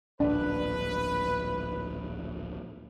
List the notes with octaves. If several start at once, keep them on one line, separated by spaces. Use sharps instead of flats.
D1 A#1 A#2 D4 B4